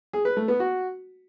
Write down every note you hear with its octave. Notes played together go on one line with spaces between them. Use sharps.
G#4
B4
A3
B3
F#4